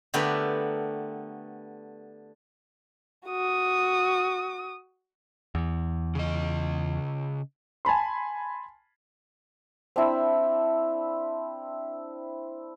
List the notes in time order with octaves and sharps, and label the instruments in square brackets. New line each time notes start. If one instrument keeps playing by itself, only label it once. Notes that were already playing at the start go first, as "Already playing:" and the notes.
[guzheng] D3 A3 B3 G4 A#4 B4
[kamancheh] F#4 D#6
[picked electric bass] E2
[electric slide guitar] C#3 D#5
[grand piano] G#5 A5 B5 C6
[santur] C4 D4 E4